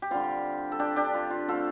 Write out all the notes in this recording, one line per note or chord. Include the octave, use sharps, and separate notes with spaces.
G4
D3 G3 C4 F4
A4
D4 G4
D4 G4
F4
F4
D3 A3 C4 F4 A4